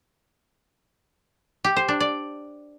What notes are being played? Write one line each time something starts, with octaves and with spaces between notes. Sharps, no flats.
G4
C5
D4
D5